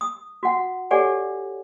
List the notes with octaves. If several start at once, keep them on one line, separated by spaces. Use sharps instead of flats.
D#6
F#4 F#5
G4 A4 C#5 D5 F#5 G#5